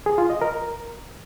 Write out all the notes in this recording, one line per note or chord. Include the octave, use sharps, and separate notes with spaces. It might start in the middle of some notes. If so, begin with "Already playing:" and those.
G#4
F4
D#5
A#4